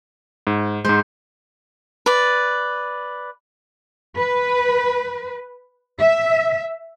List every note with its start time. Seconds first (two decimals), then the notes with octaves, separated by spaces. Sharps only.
0.47 G#2
0.85 G#2 G#3 C5
2.06 B4 D5
4.18 B4
5.99 E5